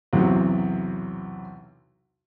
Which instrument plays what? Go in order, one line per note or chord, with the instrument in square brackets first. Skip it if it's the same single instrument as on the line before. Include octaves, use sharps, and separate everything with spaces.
[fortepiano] B1 E2 C3 F#3 E4